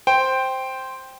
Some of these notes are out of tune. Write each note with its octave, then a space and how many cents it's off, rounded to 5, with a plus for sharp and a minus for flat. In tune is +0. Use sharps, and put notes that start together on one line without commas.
C5 +0 G5 +0